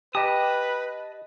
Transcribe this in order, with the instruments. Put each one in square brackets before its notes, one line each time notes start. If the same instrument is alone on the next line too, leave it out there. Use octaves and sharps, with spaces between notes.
[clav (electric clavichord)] G4 [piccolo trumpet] B4 [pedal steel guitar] D#5 A5 D#6